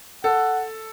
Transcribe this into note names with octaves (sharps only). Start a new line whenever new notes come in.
A4 F#5